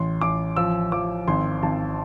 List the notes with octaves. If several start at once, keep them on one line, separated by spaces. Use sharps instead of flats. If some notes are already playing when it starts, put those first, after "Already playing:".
Already playing: A1 C6
A1 D6
F3 E6
F3 D6
G#1 C6
G#1 A5